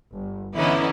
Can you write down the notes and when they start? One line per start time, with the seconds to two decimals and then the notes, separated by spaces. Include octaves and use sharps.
0.11 G1
0.56 D3 E3 B3 C#4 D#4 E4